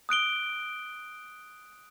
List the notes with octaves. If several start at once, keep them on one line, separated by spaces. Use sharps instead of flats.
D#6 F#6 D7 G7